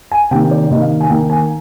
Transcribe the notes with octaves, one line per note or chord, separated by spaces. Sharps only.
G#5
C3 D#3 A#3 G5
D5
C3 D#3 A#3 D#5
F5
G#5
D#3 A#3 G5
G#5